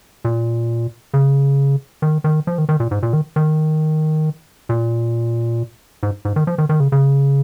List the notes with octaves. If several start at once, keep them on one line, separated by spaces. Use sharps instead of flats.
A#2
C#3
D#3
D#3
F3
D#3
D#3
A#2
G#2
A#2
D#3
D#3
A#2
G#2
G#2
D#3
F3
D#3
D#3
C#3
C#3